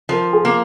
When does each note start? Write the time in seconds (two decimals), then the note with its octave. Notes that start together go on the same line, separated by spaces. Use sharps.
0.09 F3 A#4
0.33 G#4
0.45 A#3